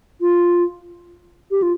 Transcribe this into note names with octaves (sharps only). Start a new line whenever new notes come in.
F4
G4
F4